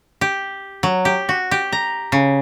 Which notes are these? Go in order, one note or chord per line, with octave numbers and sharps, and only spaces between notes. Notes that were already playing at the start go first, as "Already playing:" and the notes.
G4
F#3
G4
F#4
G4
A#5
C#3